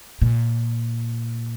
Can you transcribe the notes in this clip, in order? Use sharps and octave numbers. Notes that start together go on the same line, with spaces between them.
A#2